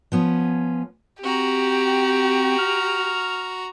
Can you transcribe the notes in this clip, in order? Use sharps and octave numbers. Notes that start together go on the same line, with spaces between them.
F3 B3 C#4
C4 F#4 G4 A#5
F6